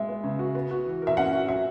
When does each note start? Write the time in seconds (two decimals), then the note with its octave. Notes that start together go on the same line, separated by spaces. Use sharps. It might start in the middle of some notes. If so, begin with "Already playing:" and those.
Already playing: G#3 E5
0.08 B3
0.24 C#3
0.39 F#4
0.55 B3
0.71 F#4
0.86 E3
1.02 A#4
1.07 E5
1.17 C#4 F#5
1.33 F#4
1.49 F#3 E5